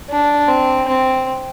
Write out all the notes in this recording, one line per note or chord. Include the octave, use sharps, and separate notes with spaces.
D4
C4
C4